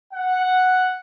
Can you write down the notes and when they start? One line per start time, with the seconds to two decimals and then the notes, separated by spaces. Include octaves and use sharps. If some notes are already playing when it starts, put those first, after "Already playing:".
0.14 F#5